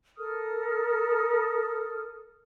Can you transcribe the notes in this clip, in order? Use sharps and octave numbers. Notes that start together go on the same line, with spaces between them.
A4 A#4 D#6 F6